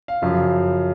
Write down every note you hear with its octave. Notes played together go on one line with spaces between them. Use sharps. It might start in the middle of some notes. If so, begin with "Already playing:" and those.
F5
F#2 C#3 F3